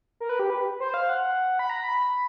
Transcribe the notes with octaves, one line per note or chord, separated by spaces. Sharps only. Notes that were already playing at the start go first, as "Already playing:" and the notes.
A#4
B4
G4
B4
C5
F5
F#5
B5
A#5
B5